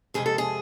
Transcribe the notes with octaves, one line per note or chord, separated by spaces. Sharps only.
F2 C3 G#3 G#4
A4
G#4